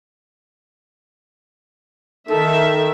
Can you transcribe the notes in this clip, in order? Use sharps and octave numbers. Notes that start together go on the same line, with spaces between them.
D#3 A4 E5